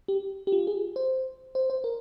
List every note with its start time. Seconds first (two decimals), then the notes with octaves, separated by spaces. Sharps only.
0.08 G4
0.47 G4
0.52 F4
0.67 G#4
0.96 C5
1.55 C5
1.70 C5
1.84 A#4